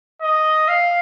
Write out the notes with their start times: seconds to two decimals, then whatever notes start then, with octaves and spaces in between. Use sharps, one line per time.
0.22 D#5
0.68 F5